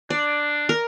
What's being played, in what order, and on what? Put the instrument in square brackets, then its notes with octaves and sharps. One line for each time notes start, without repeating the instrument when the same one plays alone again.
[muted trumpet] D4 [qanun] D5
[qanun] A#4